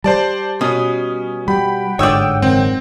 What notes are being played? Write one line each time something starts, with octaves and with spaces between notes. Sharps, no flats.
G3 C5 D5 A5
B2 C#4 D#6
G3 F#5 G5 B5
G1 G#2 D3 C#5 D5 D#6 E6 G6
F#1 G#2 D#3 C4